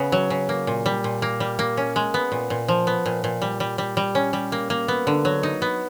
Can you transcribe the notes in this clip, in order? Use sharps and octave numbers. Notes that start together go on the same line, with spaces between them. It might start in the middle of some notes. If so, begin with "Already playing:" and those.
Already playing: C#3 B3
F#3
C#3
A#3
A#2
G3
A#2
A#3
G3
A#3
C#4
G#3
B3
A#2
A#2
F3
B3
A#2
A#2
G3
G3
G3
G3
C#4
G3
A#3
A#3
B3
D3
F#3
D#4
B3